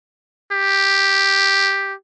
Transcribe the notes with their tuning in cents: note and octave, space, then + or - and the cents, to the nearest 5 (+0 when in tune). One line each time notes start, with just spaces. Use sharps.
G4 +0